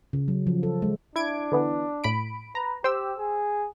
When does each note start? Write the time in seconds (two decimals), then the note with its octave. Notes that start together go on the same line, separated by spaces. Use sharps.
0.13 C#3
0.28 F#3
0.47 F3
0.63 A4
0.82 G#3
1.16 D4 E4 G#6 D7
1.52 D3 E3 B3
2.04 A2 B5 D7
2.55 B4 A#5
2.84 G4 C5 G5 E6
3.18 G#4